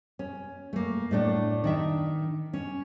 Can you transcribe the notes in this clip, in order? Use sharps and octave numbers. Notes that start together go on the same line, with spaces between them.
C#4
A3 A#3
A2 A3 D4
D#3 D4 E5
C#4